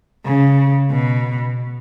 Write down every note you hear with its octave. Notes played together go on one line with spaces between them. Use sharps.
C#3
B2